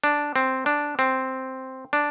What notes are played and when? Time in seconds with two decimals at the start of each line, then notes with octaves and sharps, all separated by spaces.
0.04 D4
0.36 C4
0.66 D4
0.99 C4
1.93 D4